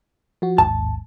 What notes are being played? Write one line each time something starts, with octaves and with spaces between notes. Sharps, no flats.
F3 F#4
A1 D#2 G#2 A5